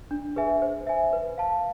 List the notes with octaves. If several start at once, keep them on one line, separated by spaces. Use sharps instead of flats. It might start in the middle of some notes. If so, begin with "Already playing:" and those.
D4
G#4 B4 E5 G#5
C5
E5 G#5
B4
F5 A5